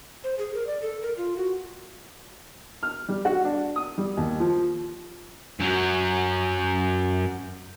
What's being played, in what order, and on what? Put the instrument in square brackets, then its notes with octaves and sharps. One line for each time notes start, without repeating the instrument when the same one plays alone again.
[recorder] C5
G#4
A#4
D5
A4
A#4
F4
F#4
[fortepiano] F6
G3
F#4
D4
D#6
G3
D#2
F3
[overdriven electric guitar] F#2 F#3